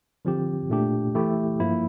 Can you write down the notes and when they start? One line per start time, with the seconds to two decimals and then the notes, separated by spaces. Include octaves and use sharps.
0.25 D3 F3 C4 G4
0.70 A#2 A3 D4 G4
1.15 E3 A3 E4 G4
1.60 G2 F3 A#3 E4